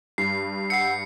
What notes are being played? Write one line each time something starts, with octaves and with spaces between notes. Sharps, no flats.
G2 C7
F#5 E6 G6 C7 C#7